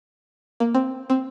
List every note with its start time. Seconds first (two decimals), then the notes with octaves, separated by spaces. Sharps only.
0.60 A#3
0.74 C4
1.10 C4